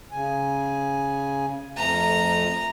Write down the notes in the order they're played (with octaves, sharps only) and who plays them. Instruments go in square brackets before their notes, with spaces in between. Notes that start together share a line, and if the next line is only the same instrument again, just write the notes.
[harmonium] C#3 G#5
[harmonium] F2 A3 [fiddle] A#5